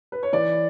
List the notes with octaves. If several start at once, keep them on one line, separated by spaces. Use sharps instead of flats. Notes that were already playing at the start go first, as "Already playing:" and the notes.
B4
C#5
E3 D5